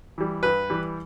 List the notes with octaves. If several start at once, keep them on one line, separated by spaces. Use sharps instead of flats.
E3 G3
G2 B4
E3 G3